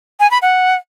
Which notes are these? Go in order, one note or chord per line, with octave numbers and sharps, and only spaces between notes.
G#5
B5
F#5